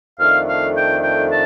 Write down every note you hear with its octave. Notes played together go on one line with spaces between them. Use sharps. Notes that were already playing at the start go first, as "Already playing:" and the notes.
F2 D#3 A3 D4 F5
F5
G5
G5
A5